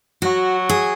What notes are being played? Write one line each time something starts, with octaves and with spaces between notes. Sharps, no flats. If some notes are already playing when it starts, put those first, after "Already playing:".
F#3 F#4
G#4